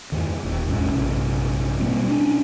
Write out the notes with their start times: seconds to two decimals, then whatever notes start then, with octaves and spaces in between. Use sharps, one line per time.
0.12 F2 G#2 D#3
0.45 D#1
0.67 E1 A1 G#3 C#4
0.92 A#1 G2 C3
1.79 B2 G3 A#3 C4
2.07 B3 C#4 D4